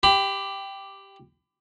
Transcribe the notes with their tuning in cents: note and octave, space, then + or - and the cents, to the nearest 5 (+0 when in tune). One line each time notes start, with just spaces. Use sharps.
G4 +0 B5 +35